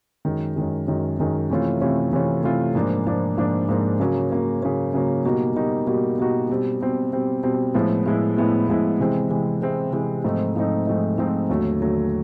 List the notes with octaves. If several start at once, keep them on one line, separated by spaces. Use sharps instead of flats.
F#2 D#3 G#3
F#2 D#3 G#3
F#2 D#3 G#3
F#2 D#3 G#3
C3 E3 A3 C#4 F4
C3 E3 A3 C#4 F4
C3 E3 A3 C#4 F4
C3 E3 A3 C#4 F4
G#2 F3 A#3 D4
G#2 F3 A#3 D4
G#2 F3 A#3 D4
G#2 F3 A#3 D4
C#3 F#3 A#3 C#4
C#3 F#3 A#3 C#4
C#3 F#3 A#3 C#4
C#3 F#3 A#3 C#4
B2 G3 A#3 D#4 F#4
B2 G3 A#3 D#4 F#4
B2 G3 A#3 D#4 F#4
B2 G3 A#3 D#4 F#4
B2 G3 C4
B2 G3 C4
B2 G3 C4
B2 G3 C4
A2 F3 G#3 B3 E4
A2 F3 G#3 B3 E4
A2 F3 G#3 B3 E4
A2 F3 G#3 B3 E4
C3 E3 G#3 C4
C3 E3 G#3 C4
C3 E3 G#3 C4
C3 E3 G#3 C4
G#2 F3 A3 C4 D#4
G#2 F3 A3 C4 D#4
G#2 F3 A3 C4 D#4
G#2 F3 A3 C4 D#4
D#2 D3 F#3 A3
D#2 D3 F#3 A3